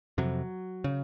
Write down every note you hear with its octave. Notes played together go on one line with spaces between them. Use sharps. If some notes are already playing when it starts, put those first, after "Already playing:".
F2 C3 F#3
C#3